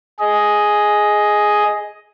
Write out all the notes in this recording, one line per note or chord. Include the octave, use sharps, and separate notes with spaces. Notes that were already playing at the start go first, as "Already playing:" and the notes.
G#4 D#5